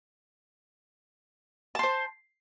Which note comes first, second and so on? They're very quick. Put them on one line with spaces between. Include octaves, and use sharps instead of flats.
A5 C6 C5